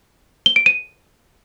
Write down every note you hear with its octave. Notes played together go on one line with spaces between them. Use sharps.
G7
D7
D#7